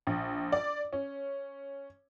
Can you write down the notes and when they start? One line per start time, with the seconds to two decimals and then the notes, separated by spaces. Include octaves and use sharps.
0.07 A#1
0.52 D5
0.93 C#4